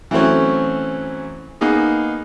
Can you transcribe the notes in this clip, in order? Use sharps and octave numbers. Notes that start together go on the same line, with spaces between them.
E3 F#3 A3 C4 C#4
A#3 B3 D#4 G#4